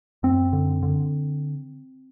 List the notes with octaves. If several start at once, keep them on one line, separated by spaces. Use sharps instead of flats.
F#2 C4
D3
D3